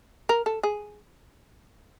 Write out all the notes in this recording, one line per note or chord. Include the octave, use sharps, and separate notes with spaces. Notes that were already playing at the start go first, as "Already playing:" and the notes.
A#4
A4
G#4